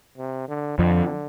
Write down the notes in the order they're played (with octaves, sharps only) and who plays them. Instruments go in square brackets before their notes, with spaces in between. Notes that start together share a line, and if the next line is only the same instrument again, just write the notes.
[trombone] C3
D3
[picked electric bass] F2 F3 [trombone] D3